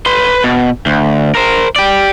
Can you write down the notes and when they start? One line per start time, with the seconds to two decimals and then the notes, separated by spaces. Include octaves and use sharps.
0.06 B4 C6
0.44 B2
0.86 D2
1.35 A#4 C5
1.76 G4 D5